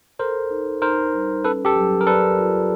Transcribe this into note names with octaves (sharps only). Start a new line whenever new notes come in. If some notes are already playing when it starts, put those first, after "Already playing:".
A4 A#4 C5
D#4
D#4 A#4 C5
G3
C#4 A4 B4
G4 A4
F#3
A#4
A4 B4 D5
F4